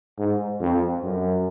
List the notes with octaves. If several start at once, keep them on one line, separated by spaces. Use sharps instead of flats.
G#2
F2
F#2